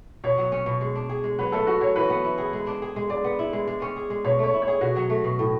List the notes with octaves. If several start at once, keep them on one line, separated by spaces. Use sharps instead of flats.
B2 C#5
F#3
C#4
B2
G#3
D4
G#4
G#3
F#3 B4
A3 A4
C#4 F#4
F#3 C#5
E3 B4
B3
E4
G#4
G#3
D4
G#4
G#3
G#3 D5
B3
E4
G#3
G#3
C#4
G#4
G#3
B2 C#5
A3 C#5
E4
C#5
G#4
B2 F#4
F#3
A3
B2
A2